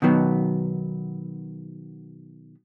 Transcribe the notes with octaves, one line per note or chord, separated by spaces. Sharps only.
B2 D#3 F#3 B3